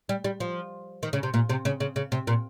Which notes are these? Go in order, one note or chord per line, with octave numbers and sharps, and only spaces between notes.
G3
G3
F3
D#3
C#3
C3
A#2
C3
C#3
C#3
C#3
C3
A#2